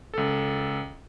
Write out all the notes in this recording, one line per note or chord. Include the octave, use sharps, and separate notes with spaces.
C#2 A4